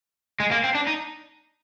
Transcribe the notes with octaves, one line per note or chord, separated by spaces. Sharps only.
G#3
A#3
C4
D4
D#4